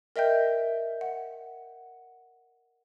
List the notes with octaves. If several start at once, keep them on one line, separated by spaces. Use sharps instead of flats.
A#4 D#5 E5 G5 G6
F#5